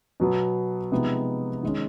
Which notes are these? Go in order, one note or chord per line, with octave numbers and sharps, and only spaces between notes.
B2 F#3 B3
C3 F3 G#3 B3 D#4
D#3 G#3 C#4